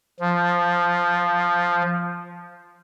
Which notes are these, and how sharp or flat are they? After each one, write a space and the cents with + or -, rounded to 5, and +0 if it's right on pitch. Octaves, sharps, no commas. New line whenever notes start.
F3 +0